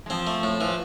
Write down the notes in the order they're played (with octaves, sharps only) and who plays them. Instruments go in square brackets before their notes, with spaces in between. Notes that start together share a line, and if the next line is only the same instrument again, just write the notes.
[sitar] G#3
[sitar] F3 [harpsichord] C4
[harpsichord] A3
A2
[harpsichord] E3 [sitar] F3